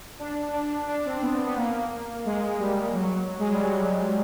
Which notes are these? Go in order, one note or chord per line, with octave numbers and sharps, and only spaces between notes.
D4
D4
D4
C4
B3
B3
A#3
G#3
G3
F#3
G#3
G3
F#3